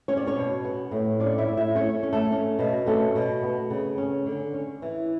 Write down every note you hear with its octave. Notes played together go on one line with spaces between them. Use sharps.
C#4 C#5
D5
C#4 C#5
B2
B3
A2
C#4 D4 D5
E4 E5
A2
E4 E5
A3 C#4 C#5
C#4
A3 A4
C#4
B2
A3 C#4 A4
B2
B3
C#3
C#4
D3
C#4
E3